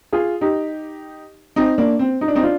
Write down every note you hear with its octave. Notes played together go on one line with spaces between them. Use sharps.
F4 G#4
D#4 G4
C4 D#4
A#3 D4
C4
D#4
D4
C4 D#4
D4 F4